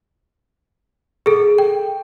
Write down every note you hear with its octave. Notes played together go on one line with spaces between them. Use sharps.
G#4 A4
G5